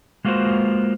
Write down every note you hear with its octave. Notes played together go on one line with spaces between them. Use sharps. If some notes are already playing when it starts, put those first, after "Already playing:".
G#3 A#3 F4 F#4 B4 C5